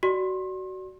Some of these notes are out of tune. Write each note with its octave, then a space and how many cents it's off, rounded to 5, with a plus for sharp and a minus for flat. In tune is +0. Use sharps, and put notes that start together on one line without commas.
F#4 +20 D5 +0 C6 +35